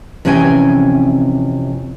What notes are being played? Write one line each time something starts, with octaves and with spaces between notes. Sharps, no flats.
F2 C3 E3 C#4 G5 G#5